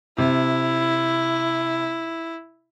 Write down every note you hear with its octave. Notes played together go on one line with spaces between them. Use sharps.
C3 E4